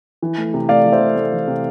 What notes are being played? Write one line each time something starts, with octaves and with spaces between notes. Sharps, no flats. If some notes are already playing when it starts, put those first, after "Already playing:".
E3
A3
C3
A3 D5 F5
E3
C5 E5
C3
A3
E3
C3